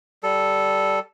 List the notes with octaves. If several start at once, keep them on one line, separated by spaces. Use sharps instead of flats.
G3 A4